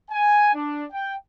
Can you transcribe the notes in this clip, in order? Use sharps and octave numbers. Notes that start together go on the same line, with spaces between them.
G#5
D4
G5